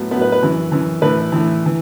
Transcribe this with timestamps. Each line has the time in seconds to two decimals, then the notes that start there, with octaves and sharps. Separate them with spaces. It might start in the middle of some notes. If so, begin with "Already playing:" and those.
Already playing: A2 F#3 B3
0.11 A2 F#3 B3
0.21 B4
0.32 B4
0.42 F#2 E3
0.72 F#2 E3
1.02 A2 E3 B4
1.32 A2 E3
1.66 E3